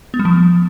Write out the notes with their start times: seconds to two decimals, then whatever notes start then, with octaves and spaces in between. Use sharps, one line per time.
0.14 B3
0.19 G3
0.25 F3